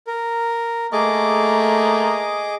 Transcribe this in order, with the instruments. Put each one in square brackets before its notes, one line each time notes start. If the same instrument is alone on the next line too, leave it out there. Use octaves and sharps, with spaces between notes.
[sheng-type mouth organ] A#4
[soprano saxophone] A3 [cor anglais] A#3 [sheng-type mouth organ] G#4 D#5 D6